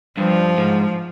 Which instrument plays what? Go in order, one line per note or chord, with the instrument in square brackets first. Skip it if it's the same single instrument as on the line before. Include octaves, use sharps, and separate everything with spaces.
[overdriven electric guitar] G2 [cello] F3
[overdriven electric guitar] G#2